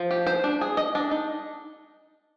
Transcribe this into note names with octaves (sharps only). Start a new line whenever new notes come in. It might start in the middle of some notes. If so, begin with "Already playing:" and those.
Already playing: F3
G4
C5
D4
G#4
D#5
D4
D#4